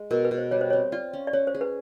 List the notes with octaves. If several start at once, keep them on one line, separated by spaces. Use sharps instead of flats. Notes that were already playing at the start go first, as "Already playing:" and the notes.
Already playing: G#3
B2 A#4
B4
B2
C5
G3 C#5
C5
C4 C#5
F4 D5
C#4
D5
C#4 C#5
C5
G#4
B4